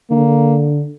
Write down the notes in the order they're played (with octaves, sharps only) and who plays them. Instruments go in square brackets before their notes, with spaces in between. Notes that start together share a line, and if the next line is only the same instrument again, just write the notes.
[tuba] D3 [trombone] A#3